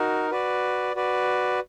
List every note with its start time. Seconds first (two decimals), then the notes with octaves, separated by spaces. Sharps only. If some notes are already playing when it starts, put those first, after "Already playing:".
Already playing: D#4 F#4 A#4
0.31 F#4 B4 D5
0.95 F#4 B4 D5